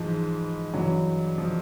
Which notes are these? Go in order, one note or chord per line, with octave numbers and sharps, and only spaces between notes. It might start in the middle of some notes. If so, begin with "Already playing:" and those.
Already playing: G#2 E3 F3
G2 E3 F#3
F3